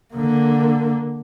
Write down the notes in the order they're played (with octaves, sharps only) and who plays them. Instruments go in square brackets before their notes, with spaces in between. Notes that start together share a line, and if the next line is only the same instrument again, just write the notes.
[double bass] D3 A#3